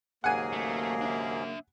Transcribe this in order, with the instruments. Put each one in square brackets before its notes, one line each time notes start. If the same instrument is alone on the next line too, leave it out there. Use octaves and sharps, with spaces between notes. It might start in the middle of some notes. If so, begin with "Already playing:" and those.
[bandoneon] D#2 G#2 G#4 [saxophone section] C#3 F#3 A#3 [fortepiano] F#5 G#5
[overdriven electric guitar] A3
D4 E5